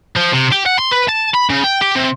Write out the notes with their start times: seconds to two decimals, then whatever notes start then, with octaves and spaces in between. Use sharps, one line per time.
0.16 F3
0.33 C3
0.52 G4
0.66 F#5
0.79 C6
0.92 B4
1.09 A5
1.35 B5
1.50 C#3
1.64 G5
1.81 G4
1.95 C3